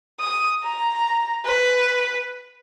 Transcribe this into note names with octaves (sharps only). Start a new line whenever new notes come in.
D#6
A#5
B4